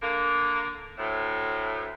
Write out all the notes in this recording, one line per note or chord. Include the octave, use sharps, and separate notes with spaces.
D3 A#3
D2 A2